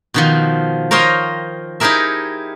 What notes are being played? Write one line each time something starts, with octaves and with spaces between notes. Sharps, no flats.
B2 D#3 F3
A#4 C5 C#5 D#5 F5 G5
D#4 E4 G4 G#4 A#4 E5